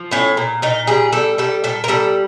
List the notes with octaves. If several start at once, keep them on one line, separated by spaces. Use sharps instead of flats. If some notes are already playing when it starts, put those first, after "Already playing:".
Already playing: F3
A2 C#4
A#2
A#2 D#4
G3 G#4
G3 A4
G3 A4
A#2 A4
A#4
G3 A4